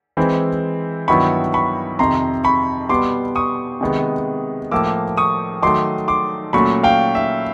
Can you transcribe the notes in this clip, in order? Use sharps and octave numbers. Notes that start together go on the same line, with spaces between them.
E3 G#3 C4 E4
G2 D#3 F#3 B3 E4 B5 C#6
B5 C#6
F2 C3 D#3 A#5 C6
B5 C#6
B2 G3 B3 C6 D6
C#6 D#6
C3 D#3 G#3 B3
A2 F3 A#3 D6 E6
C#6 D#6
D#3 F#3 A3 C6 D6
C6 D6
A#2 F#3 A3 C#4 B5 C#6
F5 G5
E5